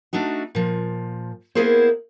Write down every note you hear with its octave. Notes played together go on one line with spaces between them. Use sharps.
A3 D4 D#4 F#4
A#2 F3
A#3 B3 E4 G#4 A#4 C5